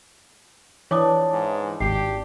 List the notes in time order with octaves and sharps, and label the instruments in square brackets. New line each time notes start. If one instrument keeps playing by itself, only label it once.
[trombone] F2 [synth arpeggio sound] E3 [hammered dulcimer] D4 [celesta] C#5 D6 D#6
[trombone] G#2
[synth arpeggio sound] G#1 [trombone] G4 [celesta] C7